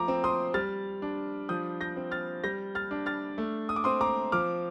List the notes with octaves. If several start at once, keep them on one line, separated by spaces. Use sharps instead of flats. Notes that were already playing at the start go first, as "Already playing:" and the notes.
Already playing: F3 A3 A#5 D6
C4
C6 D#6
G3 F6 A6
D4
F3 D#6 G6
G6 A#6
C4
F6 A6
G3 G6 A#6
F6 A6
D4
F6 A6
A3
D#6
D6
C4 C6 D#6
A#5 D6
F3 D6 F6